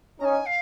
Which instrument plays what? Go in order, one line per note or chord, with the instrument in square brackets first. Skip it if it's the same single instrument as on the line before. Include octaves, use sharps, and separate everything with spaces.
[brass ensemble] C#4 D#4 [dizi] G#5 A#5
[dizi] F5